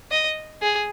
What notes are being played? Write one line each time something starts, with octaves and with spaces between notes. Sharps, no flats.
D#5
G#4